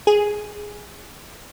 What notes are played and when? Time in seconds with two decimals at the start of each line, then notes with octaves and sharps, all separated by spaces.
0.07 G#4